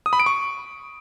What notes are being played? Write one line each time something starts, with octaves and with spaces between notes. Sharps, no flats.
D#6
B5
D7
C#6